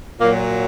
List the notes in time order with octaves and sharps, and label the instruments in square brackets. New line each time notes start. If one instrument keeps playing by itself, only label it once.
[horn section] A#2 F#3 A#3